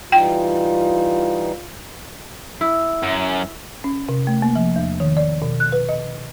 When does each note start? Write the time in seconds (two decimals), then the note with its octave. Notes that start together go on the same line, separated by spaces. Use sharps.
0.12 E3 G3 D#4 F4 G5
2.61 E4
3.03 F#2
3.84 C#4
4.09 C3
4.27 A3
4.42 A#3
4.56 F3
4.76 E2
5.00 D#3
5.17 D5
5.42 B2
5.60 F#6
5.72 B4
5.89 D#5